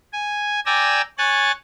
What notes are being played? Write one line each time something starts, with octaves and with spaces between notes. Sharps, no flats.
G#5
D5 G5 G#5 A#5 E6
C#5 G#5 F#6 A6